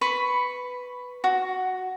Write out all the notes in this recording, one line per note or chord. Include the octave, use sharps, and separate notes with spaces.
B4 B5 C#6
F#4